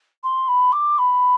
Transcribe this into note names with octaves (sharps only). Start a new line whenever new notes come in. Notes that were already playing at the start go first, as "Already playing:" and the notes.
C6
B5
D6
B5